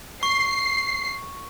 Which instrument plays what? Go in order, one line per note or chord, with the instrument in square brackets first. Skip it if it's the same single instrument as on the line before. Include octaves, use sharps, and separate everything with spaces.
[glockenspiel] C#6 [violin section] C7